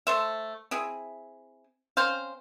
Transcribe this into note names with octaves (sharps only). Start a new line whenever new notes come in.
A3 A4 C5 E5
C4 E4 G#4
C4 C#4 C5 F5